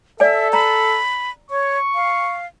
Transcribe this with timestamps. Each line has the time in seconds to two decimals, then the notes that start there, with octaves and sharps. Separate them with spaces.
0.20 A4 D5 E5 G#5
0.53 A#5 B5
1.51 C#5 C#6
1.95 F5